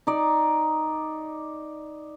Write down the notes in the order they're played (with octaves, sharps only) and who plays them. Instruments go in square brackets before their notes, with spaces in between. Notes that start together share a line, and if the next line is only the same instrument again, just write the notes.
[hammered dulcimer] D#4 D5